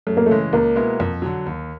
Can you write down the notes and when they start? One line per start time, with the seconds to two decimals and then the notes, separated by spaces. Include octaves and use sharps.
0.07 F#2 A3
0.17 A#3
0.26 A3
0.29 C#3 E3 G#3
0.52 C#2 A#3
0.76 B2 G#3 B3 E4
1.00 F2
1.22 D3 F#3
1.46 D#2